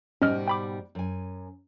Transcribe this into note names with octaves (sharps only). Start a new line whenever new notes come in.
G#2 B2 G3 C#4 D#5 F6
G5 B5 D6
F#2 G#5